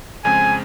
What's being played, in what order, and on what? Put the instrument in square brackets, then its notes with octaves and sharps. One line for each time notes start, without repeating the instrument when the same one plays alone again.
[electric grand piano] F2 C#3 G#3 C4 [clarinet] G#5